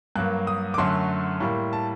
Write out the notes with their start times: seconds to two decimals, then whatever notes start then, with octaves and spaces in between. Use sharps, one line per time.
0.16 G2 F#3 A#3 F#6
0.47 D#6
0.74 D6
0.78 F#2 D3 F#3 A3 C6
1.40 A2 G3 A#3
1.73 A5